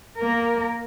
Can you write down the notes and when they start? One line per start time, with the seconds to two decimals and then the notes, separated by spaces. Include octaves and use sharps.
0.17 A#3 A#4